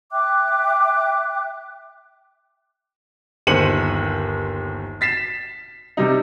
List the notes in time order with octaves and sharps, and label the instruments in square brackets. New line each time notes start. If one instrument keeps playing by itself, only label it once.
[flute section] E5 G5 D6 F#6
[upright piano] G1 D#2 C5 C#7 D#7 F#7
A6 B6 C7 E7
C3 G3 D#4